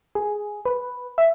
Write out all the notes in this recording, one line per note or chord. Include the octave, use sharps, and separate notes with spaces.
G#4
B4
E5